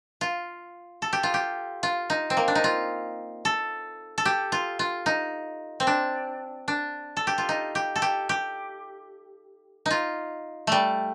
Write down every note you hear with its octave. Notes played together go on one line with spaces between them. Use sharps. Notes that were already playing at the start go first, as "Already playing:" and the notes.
F4
A4
G4
F4
G4
F4
D#4
C4
A#3
D4
D#4
F4
A4
A4
G4
F4
F4
D#4
C4
D4
D4
A4
G4
F4
D#4
G4
A4
G4
G4
D#4 F4
G3 A3